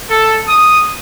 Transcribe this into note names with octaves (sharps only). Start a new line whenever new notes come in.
A4
D#6